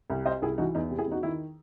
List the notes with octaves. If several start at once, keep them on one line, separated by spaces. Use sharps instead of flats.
C2
C3 C5 D#5
C2 E4 G#4
E3 D#4 F#4
E2 D#4
C3
E4 G#4
E2 D#4 F#4
D#3 E4